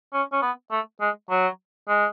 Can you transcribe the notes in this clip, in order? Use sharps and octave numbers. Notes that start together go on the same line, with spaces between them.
C#4
C#4
B3
A3
G#3
F#3
G#3